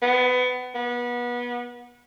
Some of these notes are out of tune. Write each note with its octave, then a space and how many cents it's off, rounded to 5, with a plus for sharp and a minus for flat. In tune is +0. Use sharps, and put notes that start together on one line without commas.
B3 +25
B3 -25